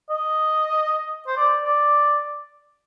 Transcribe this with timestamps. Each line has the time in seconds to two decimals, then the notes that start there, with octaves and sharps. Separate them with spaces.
0.10 D#5
1.27 C5
1.37 D5
1.64 D5